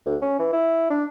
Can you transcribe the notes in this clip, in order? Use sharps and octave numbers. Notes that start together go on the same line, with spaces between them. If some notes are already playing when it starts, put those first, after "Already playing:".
D2
C#4
E3
E4
D4